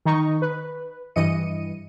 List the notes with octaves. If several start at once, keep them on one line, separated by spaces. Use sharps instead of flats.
D#3 D#4 C#6
B4
G2 E3 D#5 C#7 D#7